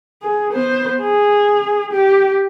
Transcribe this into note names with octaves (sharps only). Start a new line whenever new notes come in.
G#4
B3 C5
G#4
G4